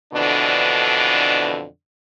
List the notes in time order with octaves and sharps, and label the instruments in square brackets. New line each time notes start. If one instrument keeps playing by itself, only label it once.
[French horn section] F2 B2 D3 E3 D4